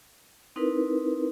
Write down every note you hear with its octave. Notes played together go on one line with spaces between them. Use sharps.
C4 D#4 E4 A#4 B4